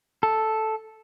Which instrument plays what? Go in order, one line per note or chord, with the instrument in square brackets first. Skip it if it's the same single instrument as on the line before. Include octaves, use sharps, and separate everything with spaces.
[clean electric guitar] A4